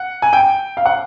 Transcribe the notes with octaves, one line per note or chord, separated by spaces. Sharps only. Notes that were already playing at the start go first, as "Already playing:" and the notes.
Already playing: F#5
G#5
G5
F5
F#5